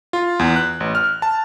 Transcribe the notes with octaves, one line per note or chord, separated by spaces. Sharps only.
F4
E2
F#6
A1
F6
A5